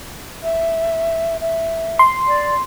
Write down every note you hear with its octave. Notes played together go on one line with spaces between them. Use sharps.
E5
E5
C6
D5